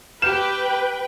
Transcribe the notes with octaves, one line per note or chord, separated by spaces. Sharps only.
G4 B4 G5 F6 G6 E7